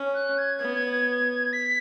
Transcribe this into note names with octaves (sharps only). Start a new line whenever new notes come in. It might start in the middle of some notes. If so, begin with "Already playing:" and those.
Already playing: C#4
F#6
G#6
B3
B6